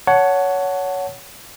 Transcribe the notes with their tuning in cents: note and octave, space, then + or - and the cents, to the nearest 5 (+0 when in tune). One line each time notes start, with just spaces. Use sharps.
C#5 +20 F#5 +0 A5 +0